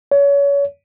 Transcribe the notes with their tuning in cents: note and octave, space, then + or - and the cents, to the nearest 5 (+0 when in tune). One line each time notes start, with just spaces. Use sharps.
C#5 +30